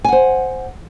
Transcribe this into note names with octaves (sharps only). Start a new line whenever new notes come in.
C5 F#5 G#5